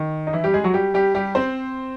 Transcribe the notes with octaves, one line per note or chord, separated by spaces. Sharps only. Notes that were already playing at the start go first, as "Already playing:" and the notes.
Already playing: D#3
D#4
E3 E4
G3 G4
G#3 G#4
F#3 F#4
G3 G4
G3 G4
G3 G4
C4 C5